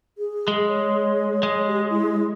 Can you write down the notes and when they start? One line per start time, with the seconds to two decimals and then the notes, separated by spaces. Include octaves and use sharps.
0.18 G#4
0.48 G#3
0.68 C#5
1.43 G#3
1.67 G4
1.90 E4